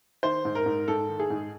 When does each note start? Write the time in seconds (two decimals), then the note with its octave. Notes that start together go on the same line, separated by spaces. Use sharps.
0.23 D#3 C5
0.45 G#2
0.55 A#4
0.66 G#2
0.88 G#2 A4
1.09 D#3
1.20 G#4
1.30 G#2